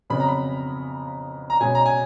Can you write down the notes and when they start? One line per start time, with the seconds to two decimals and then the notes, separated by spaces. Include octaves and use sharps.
0.10 F2 C#3 F#3 B3 B5
0.20 A#5
0.29 B5
1.50 A#5
1.60 B2 G#3 C#4 G#5
1.75 A#5
1.86 G#5